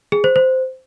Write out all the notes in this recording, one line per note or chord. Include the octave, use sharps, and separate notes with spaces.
G#4
C5
C5